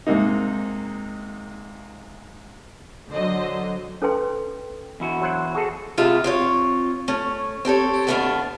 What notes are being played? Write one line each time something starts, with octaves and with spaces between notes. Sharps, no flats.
G#2 C3 A#3 D#4
D3 F#3 C5 D#5
C#4 A4 B4 G5 C6
E2 E4 F#4
F#3 C5 F#5
F#4 G#4 A4
D2 A2 C3 G#3 F4 E5
C4 F4 C#5
A3 C#4
C4 G4 A4 C#5
D#2 D#3 A3 B3 D4 F5